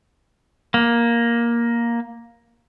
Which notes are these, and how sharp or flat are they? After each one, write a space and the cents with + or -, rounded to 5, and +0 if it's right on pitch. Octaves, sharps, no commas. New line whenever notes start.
A#3 +10